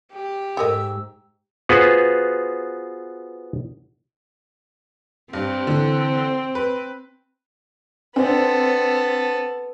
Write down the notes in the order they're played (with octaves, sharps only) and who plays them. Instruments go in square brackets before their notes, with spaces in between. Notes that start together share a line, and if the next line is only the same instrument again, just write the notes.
[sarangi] G4
[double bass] G#2 [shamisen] A4 A#4 D#5 [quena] E6
[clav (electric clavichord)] B3 F4 F#4 G#4 B4 C5
[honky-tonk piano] G2 [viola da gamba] C4
[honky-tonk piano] D3 E3
B4
[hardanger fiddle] B3 A4 [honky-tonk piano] C4 D4